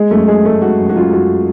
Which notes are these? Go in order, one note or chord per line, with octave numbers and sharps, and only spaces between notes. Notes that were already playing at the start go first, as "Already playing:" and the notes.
Already playing: G#3 G#4
F#2 A3 A4
G#3 G#4
G#3 A3 A4
G#3 F#4
F#2
F#4
F#2 F4
F#2 F#4